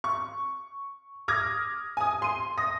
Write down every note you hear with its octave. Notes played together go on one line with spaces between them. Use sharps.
C#6
D6 D#6 F6 G#6 A#6
G#5 D#6
C6 D#7
D#6 A#6